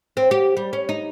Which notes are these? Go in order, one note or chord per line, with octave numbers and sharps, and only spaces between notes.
C4
G4
G3
C#4
D#4